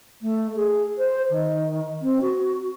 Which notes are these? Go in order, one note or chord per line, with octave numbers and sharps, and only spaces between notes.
A3
G#4
C5
D#3
C4
F#4